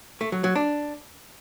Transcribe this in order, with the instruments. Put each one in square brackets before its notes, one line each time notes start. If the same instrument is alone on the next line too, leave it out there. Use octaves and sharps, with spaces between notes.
[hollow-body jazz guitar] A3
F#3
F#3
D4